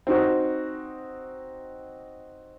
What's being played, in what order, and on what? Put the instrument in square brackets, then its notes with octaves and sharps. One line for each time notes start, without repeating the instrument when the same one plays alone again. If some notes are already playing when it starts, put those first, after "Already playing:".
[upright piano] C4 D#4 F#4